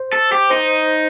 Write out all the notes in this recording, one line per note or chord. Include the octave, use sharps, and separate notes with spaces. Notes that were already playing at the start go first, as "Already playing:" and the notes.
Already playing: C5
A4
G4
D#4 C5